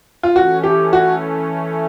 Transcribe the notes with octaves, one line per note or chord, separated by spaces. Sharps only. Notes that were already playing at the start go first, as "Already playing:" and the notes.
F4
E3 A3 C#4 F#4
G4
F#4